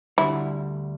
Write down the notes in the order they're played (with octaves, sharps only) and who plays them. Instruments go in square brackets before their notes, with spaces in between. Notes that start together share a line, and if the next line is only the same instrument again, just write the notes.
[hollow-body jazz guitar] D2 D3 G3 [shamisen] E4